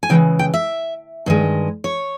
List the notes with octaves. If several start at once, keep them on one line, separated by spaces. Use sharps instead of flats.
G#5
C#3 E3 G#3 G5
G5
E5
G2 D#3 G#3
C#5